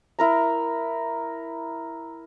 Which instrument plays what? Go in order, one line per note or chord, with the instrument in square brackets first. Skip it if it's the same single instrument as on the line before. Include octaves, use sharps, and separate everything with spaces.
[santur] E4 A#4 A#5